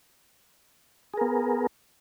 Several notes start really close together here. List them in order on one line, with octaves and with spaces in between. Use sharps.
G#4 A#4 B3